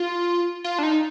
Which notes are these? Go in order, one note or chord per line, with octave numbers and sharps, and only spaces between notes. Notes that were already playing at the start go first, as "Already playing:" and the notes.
Already playing: F4
F4
D4
D#4